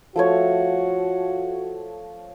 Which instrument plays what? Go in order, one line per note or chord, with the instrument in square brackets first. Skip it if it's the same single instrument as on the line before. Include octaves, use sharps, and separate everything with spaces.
[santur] F3 A3 C#5 [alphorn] F#4